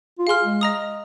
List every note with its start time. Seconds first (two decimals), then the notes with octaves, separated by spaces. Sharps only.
0.19 F4
0.27 G#4 F5 C6 F6
0.44 G#3
0.61 D#5 A#5 D#6